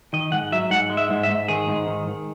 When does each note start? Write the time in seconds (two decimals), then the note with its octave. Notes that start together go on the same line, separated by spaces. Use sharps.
0.13 D#3 D#5
0.32 G#2 F#5
0.52 F#3 E5
0.71 G#2 F#5
0.90 G#3
0.97 E5
1.10 G#2
1.23 E5
1.29 G#2
1.48 D#3 G#4
1.68 G#2
1.87 D#3
2.07 D#3